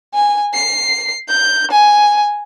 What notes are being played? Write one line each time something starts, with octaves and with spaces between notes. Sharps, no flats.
G#5
C7
G6
G#5